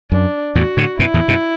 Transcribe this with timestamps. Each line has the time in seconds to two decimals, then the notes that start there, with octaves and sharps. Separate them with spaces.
0.11 F#2 D4
0.55 E2 A2 F#4
0.77 A2 D3
0.99 F#2 B2 E4
1.14 E2 A2
1.28 F#2 B2